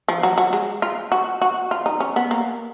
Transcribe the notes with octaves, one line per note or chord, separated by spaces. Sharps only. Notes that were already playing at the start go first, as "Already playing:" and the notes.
F3
F#3
F#3
G#3
F4
F#4
F#4
F4
D#4
C#4
B3
A#3